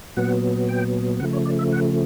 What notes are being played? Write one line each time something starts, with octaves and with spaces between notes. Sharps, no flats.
A#2 F#3 B3 F#5
G5
C#3 F3 A3 F#5
C#5
D5
E5
F#5